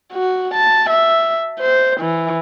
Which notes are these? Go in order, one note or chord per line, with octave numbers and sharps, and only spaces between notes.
F#4
A5
E5
C5
E3